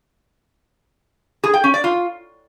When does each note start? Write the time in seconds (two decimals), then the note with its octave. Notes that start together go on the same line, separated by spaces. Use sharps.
1.44 G#4
1.54 G5
1.64 C#4
1.74 D5
1.84 F4